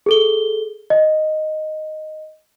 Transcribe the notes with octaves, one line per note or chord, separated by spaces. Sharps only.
G#4 A4 G7
D#5